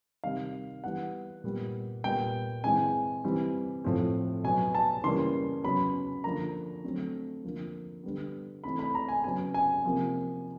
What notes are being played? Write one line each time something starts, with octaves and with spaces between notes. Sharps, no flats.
C3 D#3 G3 F5
E3 G3 B3 F#5
A#2 G3 B3
A#2 G3 B3 G5
E3 G#3 C4 G#5
E3 G3 C4
A2 F3 A3 C4
B2 F#3 B3 G#5
A5
C#3 E3 G3 A#3 C6
C#3 F#3 B3 B5
D3 F3 A#3 A#5
D3 F#3 A3 C4
D3 F3 A#3
D3 G3 B3
E3 A3 C4 B5
B5
A#5
G#5
C#3 F#3 B3 G#5
G#5
C3 F3 A#3